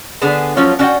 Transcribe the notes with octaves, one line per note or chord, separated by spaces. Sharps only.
D3 B3 G#4 G#5 A5
F3 F#3 A3 C#4 F4
C#4 D4 F#4 D5 F#5 G5